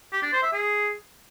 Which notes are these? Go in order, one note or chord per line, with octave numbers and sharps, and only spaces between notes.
G4
D4
C5
E5
G#4